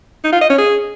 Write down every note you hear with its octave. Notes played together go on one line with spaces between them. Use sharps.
D#4
F4
D#5
C#4
G#4